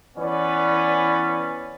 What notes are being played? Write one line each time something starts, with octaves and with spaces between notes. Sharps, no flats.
E3 B3 C#4 B4 D5